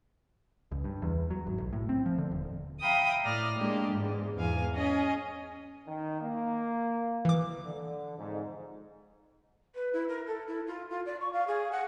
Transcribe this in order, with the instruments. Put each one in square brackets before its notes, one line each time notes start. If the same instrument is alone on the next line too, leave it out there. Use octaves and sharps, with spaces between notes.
[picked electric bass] C#2
G2
E2
F#3
G#1
B1
A2
C4
F3
D3
D#1
[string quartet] E5 F5 G5 A#5 B5 D#6
A2 D5 D#6 F6 A#6
G#3 A#3 D4 G4
E2 G#2
E2 G#2 F5 G#5
C#4 G#4 D#5
[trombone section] D#3
A#3
[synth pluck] E3 D6
[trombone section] D3
F2 G#2
[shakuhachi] B4
E4
A#4
A4
E4
F4
F4
D5
C#6
F5
G#4
F#5